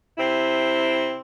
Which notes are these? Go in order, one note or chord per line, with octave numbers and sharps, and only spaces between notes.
C3 C4 E4